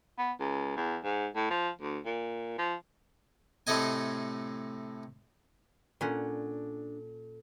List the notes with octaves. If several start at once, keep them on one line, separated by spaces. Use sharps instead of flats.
B3
C#2
E2
G#2
A2
F3
D2
A#2
F3
A2 C3 A3 D#5 G#5
A#2 C#4 D4 A4 F#5